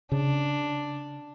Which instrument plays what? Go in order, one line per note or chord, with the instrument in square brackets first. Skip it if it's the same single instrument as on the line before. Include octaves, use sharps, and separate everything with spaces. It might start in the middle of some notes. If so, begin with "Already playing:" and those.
[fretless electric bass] C#3 [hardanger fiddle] D4